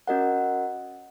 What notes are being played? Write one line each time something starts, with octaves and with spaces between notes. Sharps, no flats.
C#4 F#4 A#4 D#5 F#5